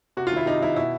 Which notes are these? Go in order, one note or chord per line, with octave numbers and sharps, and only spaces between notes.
C3 F#4
F4
D#3 E4
C3 D#4
D#3 E4
B2 E4